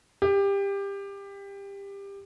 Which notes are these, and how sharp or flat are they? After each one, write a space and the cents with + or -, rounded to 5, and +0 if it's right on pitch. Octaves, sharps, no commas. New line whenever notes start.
G4 +20